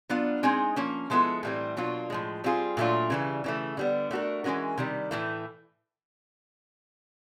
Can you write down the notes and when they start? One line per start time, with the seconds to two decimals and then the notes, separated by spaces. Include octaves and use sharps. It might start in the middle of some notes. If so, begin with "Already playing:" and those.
0.09 F#3 B3 D4 F4
0.43 G#3 C4 D#4 G#4
0.76 F3 A#3 C#4
1.10 F3 G#3 B3 E4 A4
1.43 A2 E3 G3 C4
1.77 B2 F#3 A#3 D4 F4
2.10 A2 F3 G#3
2.44 G3 C4 F4 G#4
2.77 A#2 F#3 A3 D4 F4
3.10 C#3 E3 G3
3.44 C#3 E3 A3
3.77 D3 G3 B3
4.11 A3 D4 F#4 A#4
4.44 E3 G#3 C#4 F#4 A#4
4.77 C3 D#3 G3
5.11 A2 E3 A3